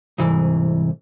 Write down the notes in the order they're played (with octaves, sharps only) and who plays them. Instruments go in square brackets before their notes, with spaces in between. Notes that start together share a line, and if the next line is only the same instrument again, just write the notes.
[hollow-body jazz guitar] C2 G#2 E3